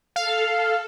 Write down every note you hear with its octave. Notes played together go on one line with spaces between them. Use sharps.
A4 F5